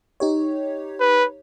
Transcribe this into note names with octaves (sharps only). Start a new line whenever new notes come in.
D#4 G4 C#5
B4